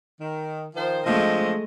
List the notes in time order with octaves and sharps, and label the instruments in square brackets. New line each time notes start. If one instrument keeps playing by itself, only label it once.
[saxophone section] D#3
D#3 F3 C5
[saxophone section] F3 C4 D4 [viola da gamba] G#3 A3 D#5